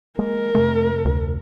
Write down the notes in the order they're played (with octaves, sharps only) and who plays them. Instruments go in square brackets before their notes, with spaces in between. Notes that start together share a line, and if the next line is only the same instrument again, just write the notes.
[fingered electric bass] G#3 A#3 [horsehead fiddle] A#4
[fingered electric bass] F2 C3 [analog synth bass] A3
[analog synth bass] D2